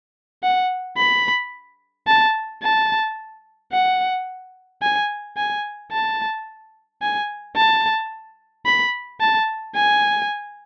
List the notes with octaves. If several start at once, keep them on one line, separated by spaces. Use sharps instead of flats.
F#5
B5
A5
A5
F#5
G#5
G#5
A5
G#5
A5
B5
A5
G#5